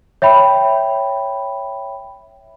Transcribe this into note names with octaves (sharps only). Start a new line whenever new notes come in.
C#5 E5 G5 B5